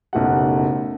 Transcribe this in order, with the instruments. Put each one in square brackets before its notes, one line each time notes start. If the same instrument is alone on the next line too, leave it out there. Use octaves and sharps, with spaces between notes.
[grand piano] F#1 B1 A3 G4 F#5